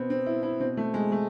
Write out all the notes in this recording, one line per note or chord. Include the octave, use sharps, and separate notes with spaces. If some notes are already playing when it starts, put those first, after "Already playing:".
Already playing: B2 B3 C4
C4
E4
E4
B2 C4
A3
G#3
A3